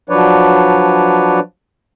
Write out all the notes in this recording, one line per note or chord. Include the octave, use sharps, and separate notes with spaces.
F3 F#3 D4 B4 C#5 D5